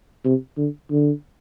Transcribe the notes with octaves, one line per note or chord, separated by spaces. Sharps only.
C3
D3
D3